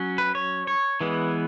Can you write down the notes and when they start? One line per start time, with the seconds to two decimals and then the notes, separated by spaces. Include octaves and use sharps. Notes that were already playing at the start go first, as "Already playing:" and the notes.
Already playing: F#3 C#4
0.18 B4
0.35 C#5
0.67 C#5
1.01 E3 G#3 B3